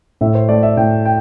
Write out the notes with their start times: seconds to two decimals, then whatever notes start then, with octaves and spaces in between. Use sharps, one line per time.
0.21 A2 E5
0.35 C5
0.49 A3 D5
0.63 E5
0.77 A2 G5
1.05 G5